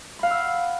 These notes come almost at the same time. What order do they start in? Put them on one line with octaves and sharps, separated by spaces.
B5 F5 F#5 E6